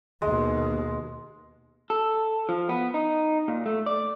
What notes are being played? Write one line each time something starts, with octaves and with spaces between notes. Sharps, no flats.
D#2 B2 G#3
A4
F3
B3
D#4
A#2
A3
D5